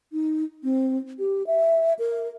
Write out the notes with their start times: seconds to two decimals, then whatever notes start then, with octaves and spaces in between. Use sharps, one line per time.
0.12 D#4
0.63 C4
1.19 G4
1.47 E5
1.99 A#4